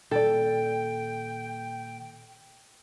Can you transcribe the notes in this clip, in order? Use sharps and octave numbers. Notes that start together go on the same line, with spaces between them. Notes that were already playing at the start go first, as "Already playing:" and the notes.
A#2 D#3 A#3 A4 D5 G5